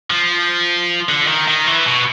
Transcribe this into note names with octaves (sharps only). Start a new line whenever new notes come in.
F3
D3
D#3
D#3
E3
B2